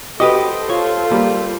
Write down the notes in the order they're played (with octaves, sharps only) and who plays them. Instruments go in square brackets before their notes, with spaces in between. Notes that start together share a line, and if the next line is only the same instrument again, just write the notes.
[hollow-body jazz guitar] F#4 G4 B4 [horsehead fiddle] A4 C5 [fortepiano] D#5
[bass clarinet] F4 [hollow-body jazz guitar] C#5
[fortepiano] G3 [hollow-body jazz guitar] A#3